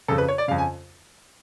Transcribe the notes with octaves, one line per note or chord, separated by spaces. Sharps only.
F2 C#3 A4
B4
C#5
D5
F2 C#3 F5
G#5